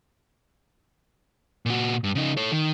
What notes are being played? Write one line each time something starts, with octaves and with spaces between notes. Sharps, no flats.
A#2 F#4
G2
C#3 D#4
A4 C#5
D#3